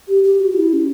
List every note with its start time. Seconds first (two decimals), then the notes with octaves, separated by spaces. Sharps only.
0.08 G4
0.24 G4
0.40 F#4
0.51 F#4
0.56 E4
0.73 C#4